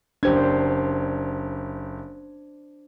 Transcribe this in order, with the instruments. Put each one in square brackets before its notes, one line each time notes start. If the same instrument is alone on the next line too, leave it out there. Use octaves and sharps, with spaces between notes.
[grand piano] F#1 G4 G#6 [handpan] D4 C5